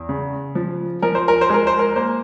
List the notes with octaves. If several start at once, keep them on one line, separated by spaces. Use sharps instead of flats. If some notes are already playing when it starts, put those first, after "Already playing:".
Already playing: E2
C#3
F3
F3 A#4
C5
A#4
C5
G#3 A#4
C5
A#4
A#3 C5